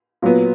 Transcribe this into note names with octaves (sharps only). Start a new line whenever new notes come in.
A#2 F#3 B3